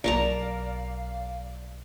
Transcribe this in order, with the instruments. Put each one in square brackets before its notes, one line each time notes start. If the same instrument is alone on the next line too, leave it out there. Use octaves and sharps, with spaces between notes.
[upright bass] B1 [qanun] A#4 A5 A#5 [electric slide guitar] D5 [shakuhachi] F5